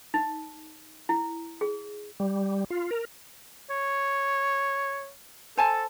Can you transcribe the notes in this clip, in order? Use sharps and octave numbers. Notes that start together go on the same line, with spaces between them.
D#4
E4
G#4
G3
F4
A#4
C#5
A4 C5 G#5 A5